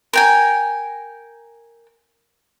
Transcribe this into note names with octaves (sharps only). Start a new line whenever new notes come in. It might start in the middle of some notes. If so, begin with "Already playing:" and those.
A#4 G5 G#5